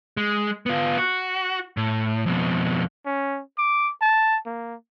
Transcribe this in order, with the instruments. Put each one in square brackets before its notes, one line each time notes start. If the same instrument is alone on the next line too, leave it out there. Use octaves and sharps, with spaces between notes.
[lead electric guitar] G#3
B3 F4
F#4
A2
F2 B2
[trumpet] C#4
D6
A5
A#3